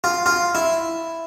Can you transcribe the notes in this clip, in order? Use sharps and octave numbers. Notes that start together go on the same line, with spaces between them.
F4
F4
E4